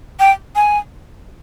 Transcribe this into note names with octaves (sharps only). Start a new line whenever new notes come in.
G5
G#5